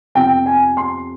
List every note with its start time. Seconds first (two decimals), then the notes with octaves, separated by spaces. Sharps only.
0.15 F2 C3 F3 G5
0.46 G#5
0.77 C6